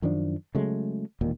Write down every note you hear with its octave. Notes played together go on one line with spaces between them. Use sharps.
F#2 D#3 F3 D4
C#3 F#3 G#3 A3
E1 D#2 A#2 D#3